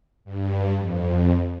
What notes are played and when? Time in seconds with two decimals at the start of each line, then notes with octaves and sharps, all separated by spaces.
0.25 G2
0.78 F2